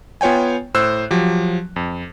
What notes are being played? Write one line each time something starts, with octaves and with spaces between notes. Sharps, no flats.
B3 F4 C#5 G5 G#5
A2 C5 E6 F#6
F3 F#3 G4
F2